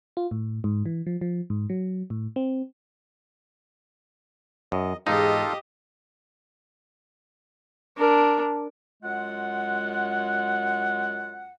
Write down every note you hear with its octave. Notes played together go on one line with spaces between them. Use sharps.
F4
A2
G#2
E3
F3
F3
G#2
F#3
A2
C4
F#2 D#5
E2 G#2 D#4 F4 G4 A4 D#5 F5
D4 A#4
F#2 G#3 F4 F#5